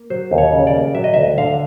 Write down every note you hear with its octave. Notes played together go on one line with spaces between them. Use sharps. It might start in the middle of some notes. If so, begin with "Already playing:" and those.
Already playing: A#3
F#3 C5
D#2
C#5
C#3
D5
A#3
F#3 E5
D#5
D2 E5
D3 F5